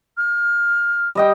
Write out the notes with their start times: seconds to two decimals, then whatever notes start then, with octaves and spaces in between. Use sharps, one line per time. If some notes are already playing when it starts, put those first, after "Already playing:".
0.17 F6
1.15 G3 D#5 G5